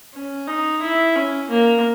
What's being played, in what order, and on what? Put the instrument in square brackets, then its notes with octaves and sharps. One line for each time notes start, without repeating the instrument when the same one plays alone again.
[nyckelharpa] C#4
D#4
E4
C#4
A#3